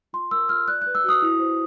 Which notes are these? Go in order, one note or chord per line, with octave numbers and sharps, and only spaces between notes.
F4 C6
A#4 E6
F4 F6
D5 F#6
F#6
B4
E6
F#4 D#6
E4
C5